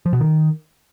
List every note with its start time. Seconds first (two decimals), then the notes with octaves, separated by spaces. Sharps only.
0.06 F3
0.13 B2
0.20 D#3